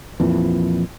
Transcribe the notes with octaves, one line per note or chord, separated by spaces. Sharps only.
F2 A#2 E3